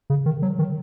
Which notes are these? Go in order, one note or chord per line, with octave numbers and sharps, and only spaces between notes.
C#3
D#3
F#3
D#3